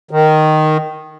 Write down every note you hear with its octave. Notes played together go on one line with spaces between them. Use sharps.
D#3